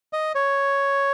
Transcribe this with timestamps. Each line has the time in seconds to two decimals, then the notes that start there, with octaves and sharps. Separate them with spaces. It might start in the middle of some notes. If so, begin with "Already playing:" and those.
0.13 D#5
0.35 C#5